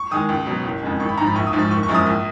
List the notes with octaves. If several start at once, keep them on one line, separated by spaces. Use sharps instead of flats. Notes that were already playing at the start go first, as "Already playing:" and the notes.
Already playing: C#6
D#3 G#3 D#6
C#2
B2 F#3
F#1
F2 C#3 G#3
G#1 C#6
B5
G#2 F3 A#5
B5
A#1 C#6
D#6
G#2 F3
C#6
F#1 C#6
C#6
F#2 F3 G#3
D#6
A#1